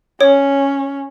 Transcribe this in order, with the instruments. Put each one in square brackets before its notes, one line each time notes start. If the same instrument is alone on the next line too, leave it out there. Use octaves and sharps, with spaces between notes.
[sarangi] C#4 [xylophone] C#5